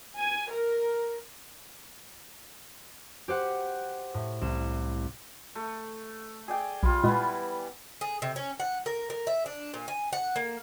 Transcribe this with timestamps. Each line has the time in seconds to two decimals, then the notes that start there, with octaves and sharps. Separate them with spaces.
0.19 G#5
0.51 A#4
3.28 G4 C5 F#5
4.14 A2
4.41 C2 E7
5.55 A3
6.48 G#4 D5 G5
6.83 B1 G3 F4
7.04 A#2 E3 G#3 B3
8.01 G#4
8.22 C3
8.36 C#4
8.60 F#5
8.86 A#4
9.10 A#4
9.27 E5
9.46 D4
9.74 A#2
9.88 G#5
10.13 F#5
10.36 A#3